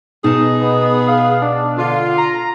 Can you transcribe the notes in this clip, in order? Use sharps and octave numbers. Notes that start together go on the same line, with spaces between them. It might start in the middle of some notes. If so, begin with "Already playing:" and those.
B2 D#4 G#4 A5
B3
F5
D4
D3 F4
A#5